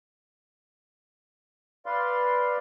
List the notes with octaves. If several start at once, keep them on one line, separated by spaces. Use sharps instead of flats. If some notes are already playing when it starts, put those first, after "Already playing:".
B4 D5 F5 C6